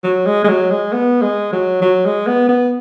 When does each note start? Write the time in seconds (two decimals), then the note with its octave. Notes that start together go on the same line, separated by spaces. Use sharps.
0.04 F#3
0.26 G#3
0.44 G#3
0.48 F#3
0.70 G#3
0.93 B3
1.22 G#3
1.52 F#3
1.82 F#3
2.05 G#3
2.27 B3
2.49 B3